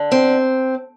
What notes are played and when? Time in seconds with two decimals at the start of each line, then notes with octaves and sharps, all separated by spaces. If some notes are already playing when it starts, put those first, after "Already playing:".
Already playing: D3
0.12 C4